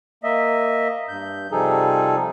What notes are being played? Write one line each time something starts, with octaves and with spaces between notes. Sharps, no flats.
A#3 D#5 E5
G2 G6
C3 F3 G3 D#4 G#4 A4